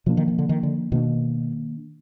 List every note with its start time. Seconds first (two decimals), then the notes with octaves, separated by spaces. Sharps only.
0.06 B2 F3 A#3 D4
0.17 D#3
0.28 D#3
0.38 D3
0.49 D#3
0.63 D3
0.92 B2 D#3 A#3 D4